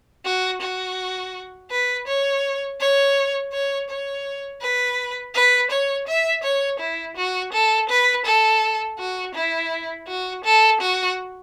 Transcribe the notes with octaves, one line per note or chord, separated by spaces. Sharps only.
F#4
F#4
B4
C#5
C#5
C#5
C#5
B4
B4
C#5
E5
C#5
E4
F#4
A4
B4
A4
F#4
E4
F#4
A4
F#4